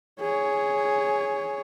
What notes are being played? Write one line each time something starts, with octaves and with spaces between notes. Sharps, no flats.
G#4 C#5